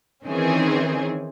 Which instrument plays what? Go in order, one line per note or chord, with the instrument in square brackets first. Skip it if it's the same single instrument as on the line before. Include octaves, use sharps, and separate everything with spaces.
[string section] D#3 E3 C4 C#4 G#4